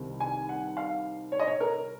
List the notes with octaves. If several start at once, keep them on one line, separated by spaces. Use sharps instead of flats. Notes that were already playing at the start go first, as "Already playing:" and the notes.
Already playing: C2 C3 D#3
G#5
F#5
F5
C#5
D#5
C#5
A#4